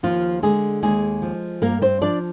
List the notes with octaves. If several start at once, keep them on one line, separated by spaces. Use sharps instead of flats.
D#2 F3 F4
D3 G#3 G#4
D#2 G#3 G#4
F3
G2 A#3 A#4
C4 C5
F3 D4 D5